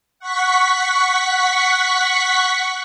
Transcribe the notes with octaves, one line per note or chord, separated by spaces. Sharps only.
F#5 C#6 B6